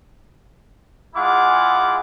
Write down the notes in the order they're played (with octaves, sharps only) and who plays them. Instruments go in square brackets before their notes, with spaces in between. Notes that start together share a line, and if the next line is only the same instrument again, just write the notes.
[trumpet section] G#3 E4 F4 G#4 F#5 D6